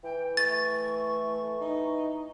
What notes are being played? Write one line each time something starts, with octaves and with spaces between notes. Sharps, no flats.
E3 G5
A3 C#6 A6
D#4